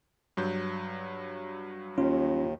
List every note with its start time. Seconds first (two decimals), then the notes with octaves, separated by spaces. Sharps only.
0.37 G2 F#3 G6
1.98 D#2 C#4 F4